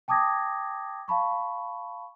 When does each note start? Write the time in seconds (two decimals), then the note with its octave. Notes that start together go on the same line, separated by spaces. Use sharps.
0.08 G5 A5 D6 D#6 G#6 A#6
1.08 F5 A5 B5 C#6